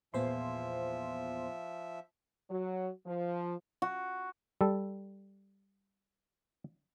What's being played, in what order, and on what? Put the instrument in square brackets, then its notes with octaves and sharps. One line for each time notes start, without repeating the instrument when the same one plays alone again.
[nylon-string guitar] E2 A#2 [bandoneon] F3 E5 [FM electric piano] B3 C5 C6
[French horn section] F#3
F3
[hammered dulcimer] F#4
[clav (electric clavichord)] G3 A4